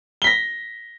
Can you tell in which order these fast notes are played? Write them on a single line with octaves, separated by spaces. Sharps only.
G7 B6 A#6